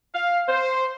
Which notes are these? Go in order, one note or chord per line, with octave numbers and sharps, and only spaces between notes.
F5
C5